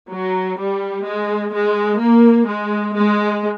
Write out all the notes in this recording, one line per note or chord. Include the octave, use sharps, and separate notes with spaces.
F#3
G3
G#3
G#3
A#3
G#3
G#3